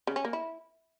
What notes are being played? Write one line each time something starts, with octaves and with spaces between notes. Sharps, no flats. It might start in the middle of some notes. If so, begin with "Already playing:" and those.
C#3
C#4
A#3
E4